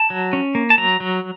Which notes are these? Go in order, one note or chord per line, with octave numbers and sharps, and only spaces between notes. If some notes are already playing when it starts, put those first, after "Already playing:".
Already playing: A5
F#3
C#4
A#3
A5
F#3 A#5
F#3